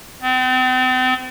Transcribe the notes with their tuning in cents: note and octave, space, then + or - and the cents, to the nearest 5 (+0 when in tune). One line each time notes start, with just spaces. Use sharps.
C4 -40